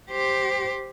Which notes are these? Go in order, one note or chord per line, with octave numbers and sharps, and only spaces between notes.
G4 C5